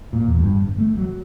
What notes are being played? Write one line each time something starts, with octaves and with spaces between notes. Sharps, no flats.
A#2
E2
G2
G1
A3
F#3